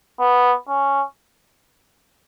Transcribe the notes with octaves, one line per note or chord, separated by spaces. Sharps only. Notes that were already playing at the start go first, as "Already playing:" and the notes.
B3
C#4